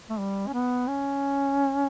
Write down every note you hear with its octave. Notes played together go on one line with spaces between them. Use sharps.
A3
G3
C#4
B3
C#4